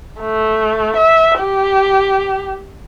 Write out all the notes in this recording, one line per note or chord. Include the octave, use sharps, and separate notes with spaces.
A3
E5
G4